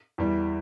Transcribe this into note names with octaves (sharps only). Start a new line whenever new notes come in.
E2 E3 G3